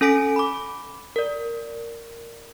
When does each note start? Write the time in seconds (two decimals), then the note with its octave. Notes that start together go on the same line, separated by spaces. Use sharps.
0.01 C#4 A4 G#5 B6 D7
0.36 B5 D6
1.16 A#4 D5